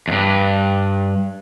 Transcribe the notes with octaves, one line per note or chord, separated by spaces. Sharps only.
E2 G2